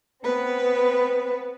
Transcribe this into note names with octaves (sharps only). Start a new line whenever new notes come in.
B3 C4 B4